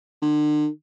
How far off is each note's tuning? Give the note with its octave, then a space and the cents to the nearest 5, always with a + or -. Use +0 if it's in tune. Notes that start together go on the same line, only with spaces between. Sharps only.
D3 +35